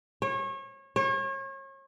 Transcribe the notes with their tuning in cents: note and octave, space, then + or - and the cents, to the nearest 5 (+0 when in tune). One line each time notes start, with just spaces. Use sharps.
C#5 -30
C#5 -35